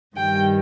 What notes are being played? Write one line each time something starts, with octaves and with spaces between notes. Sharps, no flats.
G2 D#3 G3 G5